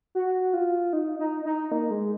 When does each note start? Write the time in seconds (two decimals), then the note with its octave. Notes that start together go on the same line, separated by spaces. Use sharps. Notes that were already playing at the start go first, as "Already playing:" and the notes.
0.15 F#4
0.53 F4
0.93 D#4
1.19 D#4
1.45 D#4
1.72 A#3
1.91 G#3